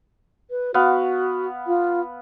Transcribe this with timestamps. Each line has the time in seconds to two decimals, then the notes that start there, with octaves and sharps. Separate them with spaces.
0.50 B4
0.74 B3 F#4 F5
1.67 F4